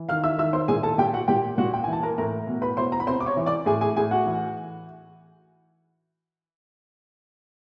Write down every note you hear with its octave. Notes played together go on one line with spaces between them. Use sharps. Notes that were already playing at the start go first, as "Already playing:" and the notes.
Already playing: E3
D#3 F5 F6
E5 E6
D#3 E5 E6
C5 C6
A#2 G#4 G#5
A4 A5
A#2 G4 G5
F#4 F#5
A#2 G4 G5
A#2 F#4 F#5
G5
E3 G#5
A5
A#4 A#5
A2 A#4 A#5
B2
B4 B5
B2 C5 C6
A#5
B5
C3 C5 C6
D6
C#5 C#6
E3
D5 D6
A2 G#4 G#5
G#4 G#5
A2 G#4 G#5
F#4 F#5
E3